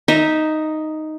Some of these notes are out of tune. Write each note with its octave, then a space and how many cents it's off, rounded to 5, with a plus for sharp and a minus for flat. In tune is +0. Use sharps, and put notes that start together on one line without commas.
D#4 +0 E5 -15 A#5 -5